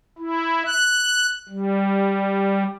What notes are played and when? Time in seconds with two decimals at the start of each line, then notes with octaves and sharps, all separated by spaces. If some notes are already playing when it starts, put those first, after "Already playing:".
0.19 E4
0.66 F#6
1.49 G3